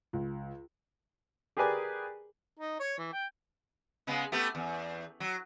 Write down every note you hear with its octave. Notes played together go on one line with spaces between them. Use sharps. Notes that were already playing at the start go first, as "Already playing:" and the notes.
C#2
G4 G#4 A#4 B4 D5 G#5
D#4
C#5
E3
G5
C#3 G#3 B3
A3 B3 G4
E2
F#3